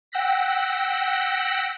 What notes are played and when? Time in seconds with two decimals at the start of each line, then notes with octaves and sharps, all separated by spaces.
0.12 F#5 G5 E6 F#6 A#6 B6